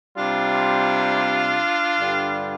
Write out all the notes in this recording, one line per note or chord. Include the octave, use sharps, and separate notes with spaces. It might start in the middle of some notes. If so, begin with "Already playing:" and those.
C3 G3 D4 F4
G2 D3 G3